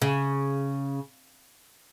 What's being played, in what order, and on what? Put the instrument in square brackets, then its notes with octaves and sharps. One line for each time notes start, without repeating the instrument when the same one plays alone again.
[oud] C#3